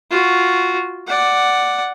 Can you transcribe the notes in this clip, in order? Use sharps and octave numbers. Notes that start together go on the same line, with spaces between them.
F4 F#4
D5 F#5